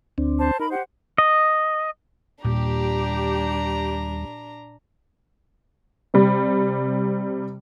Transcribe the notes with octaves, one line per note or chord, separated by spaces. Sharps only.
D2 C4 D4
C5 A5
D#4 A#4 B5
G4 C5 F#5
D#5
D#2 A#2 G3 D4 G4 A#5
C3 G3